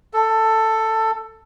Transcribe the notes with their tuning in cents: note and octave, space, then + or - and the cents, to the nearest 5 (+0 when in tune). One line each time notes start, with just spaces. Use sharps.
A4 +10